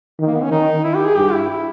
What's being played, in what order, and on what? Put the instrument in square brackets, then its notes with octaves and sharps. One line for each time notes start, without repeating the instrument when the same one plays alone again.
[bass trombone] D#3
[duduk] A#3
B3
C#4
[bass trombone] D#3 [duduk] D#4
[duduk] E4
G4
G#4
[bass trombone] G2 [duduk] G4
[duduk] E4
E4